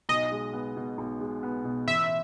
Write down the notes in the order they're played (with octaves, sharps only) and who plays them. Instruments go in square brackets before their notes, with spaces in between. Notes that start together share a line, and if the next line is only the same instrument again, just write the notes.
[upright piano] B1 [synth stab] D#5
[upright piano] G#3
B3
B2
B1
G#3
B3
B2
[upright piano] A1 [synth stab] E5